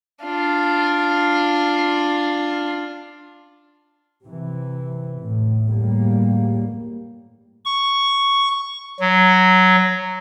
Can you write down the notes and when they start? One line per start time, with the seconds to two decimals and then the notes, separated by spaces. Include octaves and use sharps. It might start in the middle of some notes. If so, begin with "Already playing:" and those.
0.24 D4 F4
4.25 C3 E3
5.21 A2
5.65 G1 E2 A2 G3 A#3
7.65 C#6
9.00 F#3